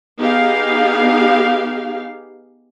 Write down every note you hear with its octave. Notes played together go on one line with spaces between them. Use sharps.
B3 D#4 G4 G#4 F5